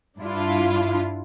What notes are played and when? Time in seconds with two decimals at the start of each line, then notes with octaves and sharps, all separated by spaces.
0.19 G2 D4 E4 F4